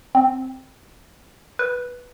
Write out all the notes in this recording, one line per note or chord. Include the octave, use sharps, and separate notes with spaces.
C4
B4